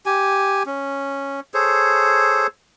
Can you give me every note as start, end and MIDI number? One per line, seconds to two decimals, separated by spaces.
0.06 0.63 67
0.06 0.63 80
0.66 1.40 61
1.54 2.47 68
1.54 2.47 69
1.54 2.47 72
1.54 2.47 73